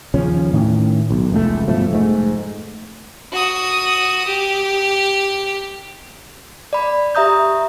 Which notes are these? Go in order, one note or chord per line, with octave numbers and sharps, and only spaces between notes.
D#2 C#3 F3 C#4
A2 D#3 C#4
B1
F1 C#2 G#2 A3
G2 B2 F3 A3
F1 G#2 A3
F#4 D#6
G4
D5 B5
G4 E5 A#5 D#6 G6